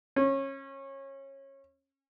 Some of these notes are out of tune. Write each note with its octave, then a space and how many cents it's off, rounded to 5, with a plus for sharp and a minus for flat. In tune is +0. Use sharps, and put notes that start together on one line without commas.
C#4 -25